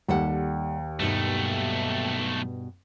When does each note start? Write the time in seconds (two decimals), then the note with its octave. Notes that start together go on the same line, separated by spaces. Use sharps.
0.09 D#2 G3 A4 F#5
1.00 B1 G2 B2 A3 D#4